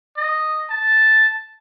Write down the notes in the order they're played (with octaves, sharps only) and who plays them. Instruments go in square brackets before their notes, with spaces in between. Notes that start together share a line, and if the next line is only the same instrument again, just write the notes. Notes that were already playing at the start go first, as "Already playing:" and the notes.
[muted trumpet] D#5
A5